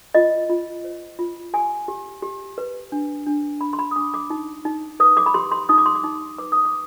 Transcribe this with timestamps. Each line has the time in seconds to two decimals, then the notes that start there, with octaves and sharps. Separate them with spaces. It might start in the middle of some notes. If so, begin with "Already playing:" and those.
0.14 F4 D#5
0.50 F4
0.84 C5
1.19 F4
1.53 G4 G#5
1.88 G4
2.22 G4
2.58 B4
2.92 D4
3.27 D4
3.61 D4 B5
3.73 C6
3.79 B5
3.91 D#6
3.96 D4 D6
4.14 D6
4.30 D#4
4.65 D#4
5.00 B4 D#6
5.17 D6
5.26 B5
5.34 G4 C6
5.52 C6
5.69 D#4 D#6
5.78 D6
5.86 C6
5.95 D6
6.04 D#4
6.38 B4 D6
6.52 D#6
6.65 D6